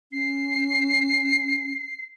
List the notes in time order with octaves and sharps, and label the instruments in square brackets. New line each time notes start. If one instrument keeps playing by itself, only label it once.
[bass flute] C#4 [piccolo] C7